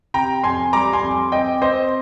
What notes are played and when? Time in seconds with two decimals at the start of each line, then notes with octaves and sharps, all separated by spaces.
0.14 C3 G5 A#5
0.44 F2 G#5 C6
0.73 G3 A#5 D6
0.93 G#5 C6
1.03 F2
1.32 C4 D#5 G5
1.62 C4 C5 D#5